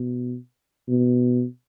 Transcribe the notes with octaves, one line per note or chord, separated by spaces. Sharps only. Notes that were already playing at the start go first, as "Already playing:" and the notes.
Already playing: B2
B2